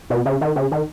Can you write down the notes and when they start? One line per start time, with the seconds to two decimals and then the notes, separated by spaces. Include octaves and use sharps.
0.10 B2
0.26 C#3
0.41 D#3
0.56 C#3
0.72 D#3